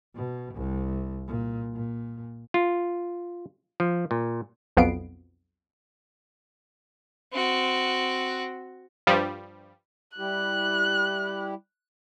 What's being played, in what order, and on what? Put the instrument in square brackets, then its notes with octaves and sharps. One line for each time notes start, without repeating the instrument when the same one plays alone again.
[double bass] B2
C2
A#2
A#2
[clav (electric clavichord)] F4
F3
A#2
[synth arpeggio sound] B1 F2 B3 F5 C7 D7
[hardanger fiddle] C4 F#4
[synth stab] G2 F3 G3
[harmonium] G3 E4 G4 [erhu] F#6